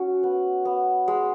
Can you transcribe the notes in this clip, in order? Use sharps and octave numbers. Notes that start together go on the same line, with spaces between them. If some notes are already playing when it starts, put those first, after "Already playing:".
Already playing: C#4 F#4
B3
B3
G#3